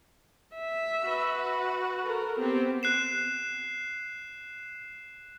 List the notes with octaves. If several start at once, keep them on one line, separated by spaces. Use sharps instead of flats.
E5
F#4 B4
A4 A#4
B3 C4 G4
F#6 C7 E7